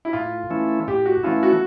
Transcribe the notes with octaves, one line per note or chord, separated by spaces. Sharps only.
E4
A2 F4
E3 A3 C#4 E4
A2 G4
F#4
E3 A3 C#4 E4 F4
F#4